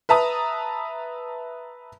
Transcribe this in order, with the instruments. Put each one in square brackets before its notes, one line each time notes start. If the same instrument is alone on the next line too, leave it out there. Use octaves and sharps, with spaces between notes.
[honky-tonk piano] B4 E5 A5 A#5 D#6